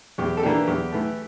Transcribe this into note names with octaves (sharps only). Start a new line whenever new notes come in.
E2 G4
A4
E3 A#3 D4 G4
E2 G4
E3 A3